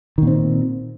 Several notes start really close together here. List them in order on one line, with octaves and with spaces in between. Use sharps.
D#3 A#2 C4